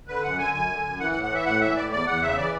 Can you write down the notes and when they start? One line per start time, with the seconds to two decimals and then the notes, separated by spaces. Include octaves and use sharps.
0.08 D3 B4
0.23 F#2 F#5
0.38 D3 G#5
0.53 F#2 G#5
0.69 D3
0.84 F#2
0.99 E3 F#5
1.11 F#5
1.15 A2
1.23 F#5
1.31 E3 E5
1.46 A2 F#5
1.61 E3 E5
1.76 A2 D5
1.92 E2 D5
2.07 E2 F#5
2.22 C#3 E5
2.38 E3 D5